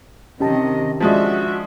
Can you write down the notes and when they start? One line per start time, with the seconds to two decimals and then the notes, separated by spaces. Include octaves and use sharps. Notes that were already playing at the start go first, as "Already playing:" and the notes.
0.40 C3 D#3 C#4 G4 D#5 A5
1.00 F3 G#3 D4 F#4 E5